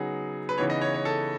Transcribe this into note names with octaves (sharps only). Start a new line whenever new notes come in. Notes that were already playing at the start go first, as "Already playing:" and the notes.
Already playing: C#3 F#3 B3 D#4 G#4
B4
C#3 E3 B3 D#4 C#5
D#5
C#5
C#5
A4